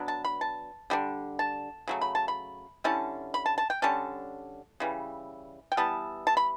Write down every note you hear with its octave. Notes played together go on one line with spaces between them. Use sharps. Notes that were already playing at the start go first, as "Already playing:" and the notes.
Already playing: F#3 B3 D4
A5
B5
A5
D3 G3 D4
A5
C#3 F#3 A3
B5
A5
B5
D3 G3 C#4 E4 A5
B5
A5
A5
G5
D3 G3 C#4 A5
C#3 E3 G3
G5
E3 G3 B3 A5
A5
B5